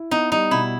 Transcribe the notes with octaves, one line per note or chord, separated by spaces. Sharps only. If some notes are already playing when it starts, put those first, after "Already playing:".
Already playing: E4
B3 D#4
G3 D#4
B2 E4